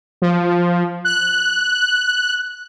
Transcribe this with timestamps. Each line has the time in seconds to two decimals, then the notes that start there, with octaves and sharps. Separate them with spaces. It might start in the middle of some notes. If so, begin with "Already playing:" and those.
0.22 F3
1.05 F#6